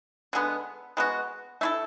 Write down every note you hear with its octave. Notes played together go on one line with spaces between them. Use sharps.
D3 G#3 B3
G#3 B3 F#4
A3 E4 A4